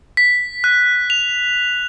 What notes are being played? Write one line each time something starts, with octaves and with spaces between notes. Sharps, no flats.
B6
F#6
F7